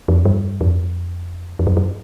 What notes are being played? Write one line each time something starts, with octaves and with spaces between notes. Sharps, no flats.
F2
G2
F2
F2
F#2
F#2